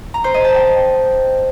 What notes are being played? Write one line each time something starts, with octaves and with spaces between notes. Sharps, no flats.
A#5
C5
D#5
A5
G5